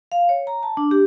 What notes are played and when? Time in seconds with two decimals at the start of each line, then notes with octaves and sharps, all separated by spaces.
0.12 F5
0.29 C#5
0.47 A#5
0.63 A5
0.77 D4
0.91 G4